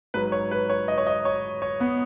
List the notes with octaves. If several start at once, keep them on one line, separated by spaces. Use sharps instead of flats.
G#2 F#3 B4
C#5
B4
C#5
D#5
C#5
D#5
C#5
C#5
B3